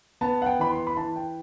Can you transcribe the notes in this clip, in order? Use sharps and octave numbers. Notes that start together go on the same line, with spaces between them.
B3 A5
F#5
G5
E3 B5
C6
B5
E3 A5
G5